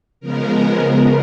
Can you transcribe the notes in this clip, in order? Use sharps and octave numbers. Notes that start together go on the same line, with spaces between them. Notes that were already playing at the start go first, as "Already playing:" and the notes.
C#3 F3 G#3 B3 A#4